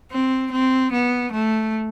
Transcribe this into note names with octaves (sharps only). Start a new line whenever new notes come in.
C4
C4
B3
A3